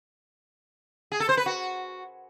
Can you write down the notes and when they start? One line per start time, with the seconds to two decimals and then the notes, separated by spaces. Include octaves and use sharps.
1.12 G#4
1.20 A4
1.29 C5
1.37 B4
1.46 F#4